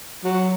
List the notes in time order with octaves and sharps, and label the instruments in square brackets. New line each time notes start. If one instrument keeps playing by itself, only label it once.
[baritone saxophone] F#3